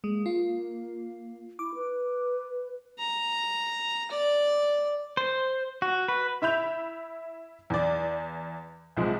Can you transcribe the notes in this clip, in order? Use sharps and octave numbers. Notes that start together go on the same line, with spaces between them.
G#3 A#3
F4
E4 D6
B4
A#5
D5
C5
F#4
B4
E4 E5 B5 G6 F7
E2 D5
C2 F3 G#3